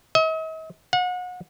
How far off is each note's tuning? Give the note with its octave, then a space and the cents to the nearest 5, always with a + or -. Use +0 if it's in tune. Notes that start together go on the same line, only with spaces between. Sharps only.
D#5 +45
F#5 -35